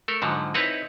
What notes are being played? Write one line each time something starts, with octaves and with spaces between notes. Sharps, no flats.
A3 A4 A#4
G#2 D3 F3 F#3
C4 D#4 E4 B4 C#5